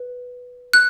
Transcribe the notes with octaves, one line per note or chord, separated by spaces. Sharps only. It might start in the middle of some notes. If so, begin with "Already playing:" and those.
Already playing: B4
F#6